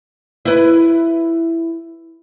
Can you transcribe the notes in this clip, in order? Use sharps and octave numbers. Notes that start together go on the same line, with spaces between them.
E4 B4